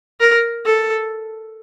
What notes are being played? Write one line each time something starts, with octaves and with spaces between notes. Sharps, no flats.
A#4
A4